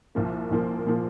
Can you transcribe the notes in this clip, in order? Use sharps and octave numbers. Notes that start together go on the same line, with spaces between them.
C2 A#2 F3 A#3
C2 A#2 F3 A#3
A#2 F3 A#3